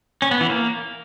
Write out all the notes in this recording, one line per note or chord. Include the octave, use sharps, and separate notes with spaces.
C#4
B3
E3
A#3